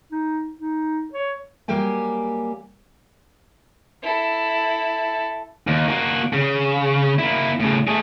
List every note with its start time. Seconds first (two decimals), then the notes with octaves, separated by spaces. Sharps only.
0.11 D#4
0.60 D#4
1.13 C#5
1.68 F#3 G3 A#3 G4 G5 G#5
4.03 E4 A4
5.67 D#2
5.88 A#3 F#4
6.33 C#3
7.19 A#3 E4
7.60 A2 C#3
7.87 A3 G#4